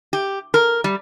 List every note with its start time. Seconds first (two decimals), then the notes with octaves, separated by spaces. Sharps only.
0.13 G4
0.54 A#4
0.84 G3